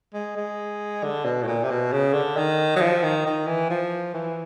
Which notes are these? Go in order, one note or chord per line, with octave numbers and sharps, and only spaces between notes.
G#3
G#3
D3
B2
A2
A#2
C3
B2
C#3
D3
D#3
F#3
F3
D#3
D#3
E3
F3
E3